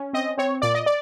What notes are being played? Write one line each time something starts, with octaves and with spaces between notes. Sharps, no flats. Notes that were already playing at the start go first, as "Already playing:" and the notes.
Already playing: C#4
C4 D#5
C4 C#5
A#2 D5
D#5
D5